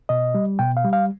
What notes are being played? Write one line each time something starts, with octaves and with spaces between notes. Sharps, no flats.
B2 D#5
G3
B2 G5
F5
G3
F5